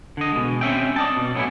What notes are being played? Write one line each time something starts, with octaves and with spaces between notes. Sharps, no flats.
D3 D#5
B2 G#3
C4 C#4 E5 G5
D5 D#5 A5
B2
A2 F#3 C4 C#4 E4